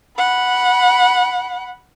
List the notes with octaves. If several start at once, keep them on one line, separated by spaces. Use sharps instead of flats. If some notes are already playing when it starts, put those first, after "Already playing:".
F#5 B5